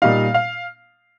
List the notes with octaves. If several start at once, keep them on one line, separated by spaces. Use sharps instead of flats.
A#2 G3 D#4 F5
F5